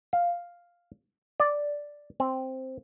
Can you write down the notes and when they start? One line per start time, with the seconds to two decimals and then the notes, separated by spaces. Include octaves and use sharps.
0.13 F5
1.40 D5
2.20 C4